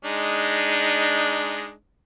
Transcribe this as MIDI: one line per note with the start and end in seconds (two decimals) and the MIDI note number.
0.05 1.72 56
0.05 1.72 62
0.05 1.72 63